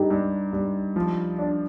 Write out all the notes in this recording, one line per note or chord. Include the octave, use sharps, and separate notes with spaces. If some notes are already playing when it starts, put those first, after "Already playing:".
Already playing: G2 D#4 G4
G2
G2
F3
D4